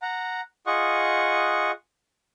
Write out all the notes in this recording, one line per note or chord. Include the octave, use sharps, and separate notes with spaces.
F#5 A#5
F4 G#4 D#5 F#5 C#6